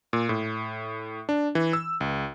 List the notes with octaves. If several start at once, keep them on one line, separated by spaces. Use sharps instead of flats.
A#2
A2
D4
E3
E6
C#2